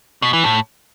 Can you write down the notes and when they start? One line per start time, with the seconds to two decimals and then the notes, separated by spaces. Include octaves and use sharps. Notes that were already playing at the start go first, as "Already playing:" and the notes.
0.22 B2
0.33 E3
0.44 A2